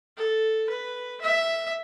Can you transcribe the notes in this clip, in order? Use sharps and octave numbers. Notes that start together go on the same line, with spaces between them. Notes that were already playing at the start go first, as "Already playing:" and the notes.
A4
B4
E5